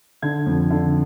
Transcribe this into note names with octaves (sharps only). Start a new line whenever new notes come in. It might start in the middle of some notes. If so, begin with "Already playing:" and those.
D3 G#6
F2
D3